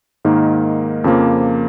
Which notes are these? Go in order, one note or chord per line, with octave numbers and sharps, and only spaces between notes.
G#2 D#3 A#3 D#4
F2 C#3 F3 A#3